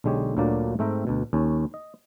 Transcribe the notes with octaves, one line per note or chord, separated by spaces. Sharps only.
B1 D3 G#3 G4 C#5
D2 A#2 D3 F#3 A#3 D5
G#2 A3 C4 E5 G5 A#5
D2 B2
D#2 C#4
D#5